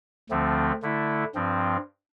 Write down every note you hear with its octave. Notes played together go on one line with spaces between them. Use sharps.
D2 D3 F3 A3 C4
D3 A3 E4
G2 F3 C4